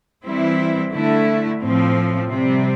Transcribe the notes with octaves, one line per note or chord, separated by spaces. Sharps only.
E3 G3 C4 E4
D3 A3 E4
A2 F3 C4
C3 G3 C4